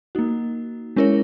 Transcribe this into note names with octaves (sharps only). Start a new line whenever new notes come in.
A#3 D#4 F#4
G#3 C#4 E4 A#4 C#5